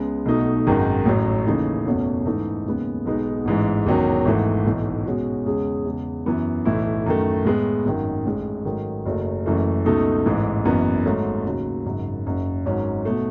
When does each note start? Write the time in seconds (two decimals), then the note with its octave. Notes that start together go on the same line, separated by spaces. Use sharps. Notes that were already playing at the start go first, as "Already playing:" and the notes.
Already playing: C#2 C#3 G#3 B3
0.25 B1 B2 A3 D#4
0.67 G#1 F#2 D#3 G#3
1.05 A1 A2 F#3
1.45 D#2 C#3 E3 A3 D#4
1.86 F#1 E2 B2 A3 C#4
2.25 G#2 E3 A3 D#4 A4
2.66 D#2 C#3 G#3 B3
3.05 B1 B2 G#3 B3 D#4
3.45 A1 G#2 E3 G#3
3.86 E1 E2 D#3 F#3 C#4
4.25 G#1 G#2 E3 A3
4.65 B1 A2 E3
5.05 B2 G#3 C#4 F#4
5.46 E2 C#3 G#3 C#4 G#4
5.85 E2 C#3 G#3
6.26 F#2 E3 B3
6.65 B1 A2 E3 A3 E4
7.06 F#2 D#3 A3
7.45 A2 G#3 B3
7.85 G#1 F#2 D#3
8.25 A1 A2 G#3
8.65 G#2 D#3 F#3 A3
9.05 F#1 F#2 C#3 F#3 A3
9.46 F#1 F#2 E3 A3
9.85 C#2 B2 A3 D#4 A4
10.26 A1 G#2 E3
10.65 F#1 F#2 E3 B3
11.05 G#1 G#2 F#3 A3 C#4
11.45 D#2 C#3 F#3 C#4
11.86 G#1 F#2 C#3
12.25 F#1 F#2 C#3
12.66 G#1 G#2 F#3 C#4
13.05 B2 A3